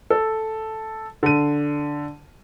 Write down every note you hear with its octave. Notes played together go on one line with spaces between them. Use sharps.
A4
D3 D#7